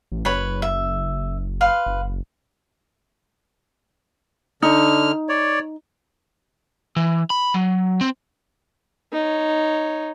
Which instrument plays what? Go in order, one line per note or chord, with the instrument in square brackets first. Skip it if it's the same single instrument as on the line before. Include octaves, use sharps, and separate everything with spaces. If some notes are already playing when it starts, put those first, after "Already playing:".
[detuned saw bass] A1
[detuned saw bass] F#1 [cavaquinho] B4 C#5 B5
[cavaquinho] E5
B4 F5 C6
[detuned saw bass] F#1
[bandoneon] D3 F6 [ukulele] D#4
[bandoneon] C#5 D5
[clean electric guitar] E3
B5
F#3
C4
[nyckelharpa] D#4 C#5